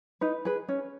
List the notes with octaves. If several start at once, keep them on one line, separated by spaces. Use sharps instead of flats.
D#4 B4
G#4 B4
C#4